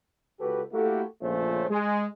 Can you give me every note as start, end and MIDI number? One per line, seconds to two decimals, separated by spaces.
0.40 0.62 37
0.40 0.62 66
0.40 0.62 67
0.40 0.62 69
0.40 0.62 71
0.73 1.03 57
0.73 1.03 58
0.73 1.03 64
0.73 1.03 66
0.73 1.03 67
0.73 1.03 69
1.22 1.65 34
1.22 1.65 49
1.22 1.65 57
1.22 1.65 61
1.22 1.65 65
1.22 1.65 72
1.70 2.07 56